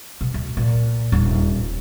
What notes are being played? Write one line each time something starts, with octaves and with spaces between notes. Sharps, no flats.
B2
D2
A#2
D#1 A#1